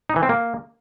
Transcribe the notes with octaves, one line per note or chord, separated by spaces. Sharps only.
D#4
E3
C4
A#3